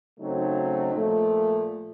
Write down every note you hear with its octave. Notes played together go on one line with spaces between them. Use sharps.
C#3 F#3 A3 C4 D#4
A#2 F3 A3